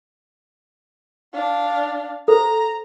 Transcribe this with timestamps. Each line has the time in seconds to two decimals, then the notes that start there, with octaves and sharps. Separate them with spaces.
1.34 D4 F5
2.28 A4 C5 A#5